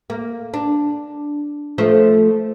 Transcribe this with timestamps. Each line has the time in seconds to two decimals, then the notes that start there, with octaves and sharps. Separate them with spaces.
0.10 A#3
0.54 D4
1.78 F3 A3 C5